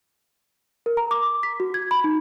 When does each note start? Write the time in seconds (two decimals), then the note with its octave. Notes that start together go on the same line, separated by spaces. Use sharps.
0.86 A#4
0.97 A#5
1.11 D6
1.43 B6
1.60 F#4
1.74 G#6
1.91 B5
2.04 D#4